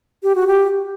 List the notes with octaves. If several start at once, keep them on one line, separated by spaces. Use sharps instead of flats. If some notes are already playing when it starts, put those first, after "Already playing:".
G4
F#4
G4